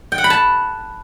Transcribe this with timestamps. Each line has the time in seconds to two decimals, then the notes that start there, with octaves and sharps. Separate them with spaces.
0.12 G5
0.18 F#5
0.24 B5
0.30 A5